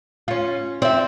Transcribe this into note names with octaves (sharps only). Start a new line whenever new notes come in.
C#4 F4
C4 D5 E5